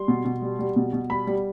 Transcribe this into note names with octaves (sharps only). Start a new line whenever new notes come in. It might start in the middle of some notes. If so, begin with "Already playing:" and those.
Already playing: G3 C6
B2
B2
G3
G3
B2
B2
G3 B5
G3